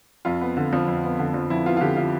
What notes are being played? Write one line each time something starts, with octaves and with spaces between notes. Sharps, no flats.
F2 F4
B3
D3
F3
F2
B3
D3
F3
F2 E4
B3 F4
F4
D3 G4
F3 F4